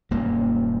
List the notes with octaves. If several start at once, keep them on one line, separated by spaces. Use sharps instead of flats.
D#1 F#2 A#3